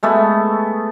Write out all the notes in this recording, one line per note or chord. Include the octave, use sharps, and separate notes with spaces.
G#3 A3 B3 A4